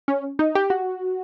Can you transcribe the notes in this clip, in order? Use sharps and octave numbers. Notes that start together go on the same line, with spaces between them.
C#4
D#4
G4
F#4